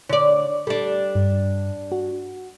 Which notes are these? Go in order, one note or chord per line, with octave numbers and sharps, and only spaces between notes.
D3 C#5 D5 D6
G3 D4 A4
G2
F#4